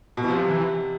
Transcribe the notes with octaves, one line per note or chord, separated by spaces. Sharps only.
B2
E3
C3 F3
E3